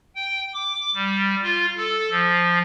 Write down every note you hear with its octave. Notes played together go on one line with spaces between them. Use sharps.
G5
D6
G3
F4
A4
F3